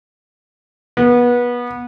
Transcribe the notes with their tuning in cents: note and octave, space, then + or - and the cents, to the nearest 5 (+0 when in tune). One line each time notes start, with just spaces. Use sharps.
B3 -25